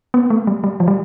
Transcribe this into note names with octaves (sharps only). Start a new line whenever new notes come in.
B3
A3
G3
G3
F3
G3